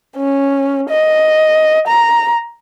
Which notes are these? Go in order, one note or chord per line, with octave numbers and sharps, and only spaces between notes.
C#4
D#5
A#5